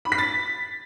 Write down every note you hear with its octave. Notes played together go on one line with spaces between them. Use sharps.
B5
B6
A6